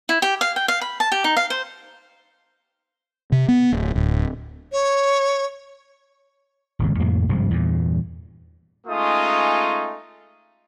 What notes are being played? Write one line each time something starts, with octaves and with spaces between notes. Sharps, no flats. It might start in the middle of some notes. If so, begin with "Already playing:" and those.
E4
G4
F5
G5
F5
B5
A5
G4
D#4
F5
C5
C3
B3
D1
D1
C#5
D#1 G#1 C#2
F2 A2 C3 A#3
G#1 G2 C3 F3
E2 G2 A#2
G#3 A3 C#4 D#4 F4 D#6